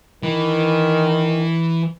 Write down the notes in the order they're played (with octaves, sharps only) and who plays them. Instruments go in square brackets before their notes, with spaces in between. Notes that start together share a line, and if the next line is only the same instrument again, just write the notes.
[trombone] D#3 [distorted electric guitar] E3